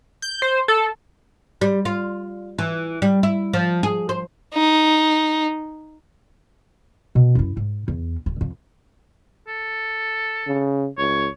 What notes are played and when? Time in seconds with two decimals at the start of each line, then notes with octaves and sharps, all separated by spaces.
0.22 G6
0.42 C5
0.68 A4
1.61 G3
1.85 F4
2.58 E3
3.02 G3
3.23 E4
3.53 F3
3.83 G#4
4.09 C5
4.54 D#4
7.15 B2
7.35 F#2 E4
7.57 G#2
7.88 E2
8.26 D1
8.41 F2
9.47 A4
10.47 C#3
10.98 C#2 C#5